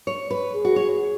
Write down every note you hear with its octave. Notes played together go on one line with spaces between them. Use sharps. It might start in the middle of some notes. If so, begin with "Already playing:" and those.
C#5
B4
G#4
F#4
C#5